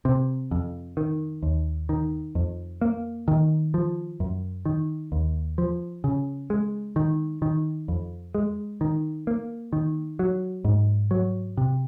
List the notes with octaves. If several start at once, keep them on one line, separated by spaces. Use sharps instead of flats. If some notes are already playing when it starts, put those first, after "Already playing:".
C3
F2
D#3
D#2
D#3
F2
A#3
D#3
F3
F#2
D#3
D#2
F3
C#3
G#3
D#3
D#3
F2
G#3
D#3
A#3
D#3
F#3
G#2
F#3
C3